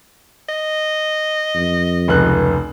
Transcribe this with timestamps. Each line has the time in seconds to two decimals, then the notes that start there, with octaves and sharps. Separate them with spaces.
0.49 D#5
1.55 F2
2.08 F1 C#2 F#6